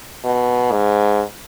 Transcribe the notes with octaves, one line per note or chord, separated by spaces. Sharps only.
B2
G#2